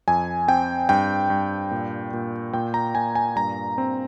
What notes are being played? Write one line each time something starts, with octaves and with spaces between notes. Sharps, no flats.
F2 G#5
C4 G5
G2 G5
G2
A#2
A#2
A#2 G5
A#5
A#2 G#5
G#5
G2 A#5
C4